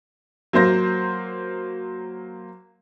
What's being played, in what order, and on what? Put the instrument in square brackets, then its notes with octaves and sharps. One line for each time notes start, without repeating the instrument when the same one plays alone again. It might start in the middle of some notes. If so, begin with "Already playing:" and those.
[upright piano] F#3 A#3 C5 A#6